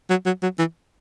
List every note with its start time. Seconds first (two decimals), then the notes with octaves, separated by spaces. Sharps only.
0.10 F#3
0.26 F#3
0.43 F#3
0.59 E3